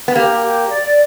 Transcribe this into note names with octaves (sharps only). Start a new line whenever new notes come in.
B3
A#3 G4
G4
D5